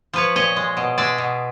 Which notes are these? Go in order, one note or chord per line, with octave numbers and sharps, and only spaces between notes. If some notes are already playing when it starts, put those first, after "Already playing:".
F3 B4 C#5
A#2 C#5 D#5
G#3
B2
G#3 D5 E5
B2